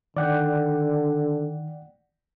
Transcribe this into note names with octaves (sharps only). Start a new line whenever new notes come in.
D3 D#3 D5 F#5 G5